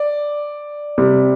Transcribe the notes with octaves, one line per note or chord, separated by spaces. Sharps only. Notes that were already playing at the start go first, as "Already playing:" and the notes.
Already playing: D5
C3 G3